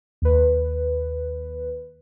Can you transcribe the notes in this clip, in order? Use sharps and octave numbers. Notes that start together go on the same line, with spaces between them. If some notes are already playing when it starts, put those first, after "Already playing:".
D#2 B4